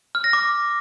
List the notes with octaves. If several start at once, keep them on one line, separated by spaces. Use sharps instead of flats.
F6
A#6
D6